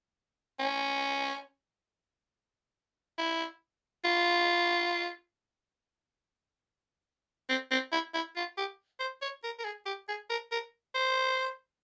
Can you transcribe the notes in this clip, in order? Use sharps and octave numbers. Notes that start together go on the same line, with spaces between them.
C#4
E4
F4
C4
C4
E4
E4
F4
G4
C5
C#5
A#4
A#4
G#4
G4
G#4
A#4
A#4
C5